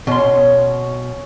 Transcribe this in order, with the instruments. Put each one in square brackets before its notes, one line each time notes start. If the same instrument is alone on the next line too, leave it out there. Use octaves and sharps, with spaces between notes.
[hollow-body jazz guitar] B2 C6 [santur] C#4